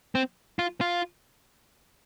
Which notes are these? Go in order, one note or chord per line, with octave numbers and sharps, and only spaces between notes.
C4
F4
F4